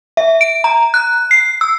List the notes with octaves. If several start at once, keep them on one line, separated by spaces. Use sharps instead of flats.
E5
D7
A#5
F#6
C7
E6